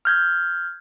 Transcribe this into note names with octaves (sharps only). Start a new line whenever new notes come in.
F6 G6 G#6